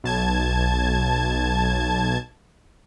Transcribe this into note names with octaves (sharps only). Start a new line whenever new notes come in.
B1 A5 G#6